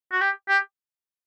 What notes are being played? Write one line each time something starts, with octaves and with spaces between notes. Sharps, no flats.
F#4
G4
G4